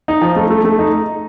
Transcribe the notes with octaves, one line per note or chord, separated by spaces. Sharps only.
D#4
F3
A3
A3
A3
D#4